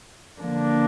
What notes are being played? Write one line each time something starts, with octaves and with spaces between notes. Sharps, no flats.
D3 F3 A#3 D4